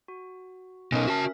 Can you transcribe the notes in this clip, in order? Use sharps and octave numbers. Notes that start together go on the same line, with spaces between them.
F#4
B2 C#4 D#4 A#4
F#4 E5 A5